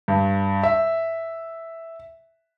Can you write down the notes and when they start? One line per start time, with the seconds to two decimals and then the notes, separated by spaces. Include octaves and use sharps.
0.08 G2
0.63 E5